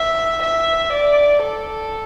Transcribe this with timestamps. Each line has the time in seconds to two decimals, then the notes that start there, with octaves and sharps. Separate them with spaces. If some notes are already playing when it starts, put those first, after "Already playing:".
Already playing: E5
0.43 E5
0.92 D5
1.42 A4